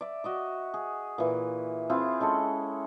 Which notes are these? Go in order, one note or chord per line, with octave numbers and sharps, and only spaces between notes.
D5 E5
F#4 D#5 E5
G#4
A#2 E3
C4 E4 F4 G#4
G#3 C#4 A4 F#5